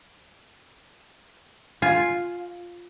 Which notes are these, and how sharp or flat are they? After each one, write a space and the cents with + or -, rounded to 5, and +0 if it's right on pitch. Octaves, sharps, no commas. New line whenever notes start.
F4 +0 G#5 +10